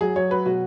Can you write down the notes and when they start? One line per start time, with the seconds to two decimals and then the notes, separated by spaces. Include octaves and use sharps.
0.01 F#3 G#4
0.16 F#3 C#5
0.31 F#3 B4
0.46 B2 F#4